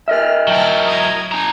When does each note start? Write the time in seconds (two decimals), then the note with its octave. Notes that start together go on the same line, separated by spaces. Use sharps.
0.08 A#4 D#5 E5 F6
0.48 F#3 E4 G5 A5 F6
0.85 A#5 D#6 G#6
1.32 D4 G#5 A#5